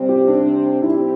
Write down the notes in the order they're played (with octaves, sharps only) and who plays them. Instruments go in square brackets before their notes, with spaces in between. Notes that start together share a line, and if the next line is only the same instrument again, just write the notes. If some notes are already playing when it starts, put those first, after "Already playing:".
Already playing: [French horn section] C3 G3 C4
[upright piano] G4
D4
[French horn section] C3 G3 C4 G4 [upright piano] E4